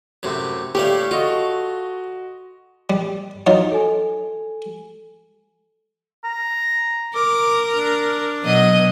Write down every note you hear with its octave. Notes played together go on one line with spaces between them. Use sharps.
F#2 A2 C3
A2 G3 A3 G4 C#5 F5
F4 F#4 A4 D#5
G3
F#3 D#4 F4
A4 G#5
A#5
A#4 D6
D4
B2 F#3 D#5